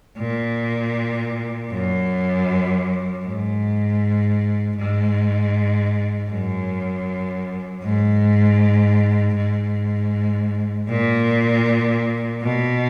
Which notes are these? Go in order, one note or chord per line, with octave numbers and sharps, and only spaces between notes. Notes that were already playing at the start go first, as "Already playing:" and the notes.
A#2
F#2
G#2
G#2
F#2
G#2
G#2
A#2
B2